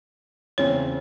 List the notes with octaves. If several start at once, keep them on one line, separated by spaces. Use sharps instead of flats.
E2 C#3 C4 C#5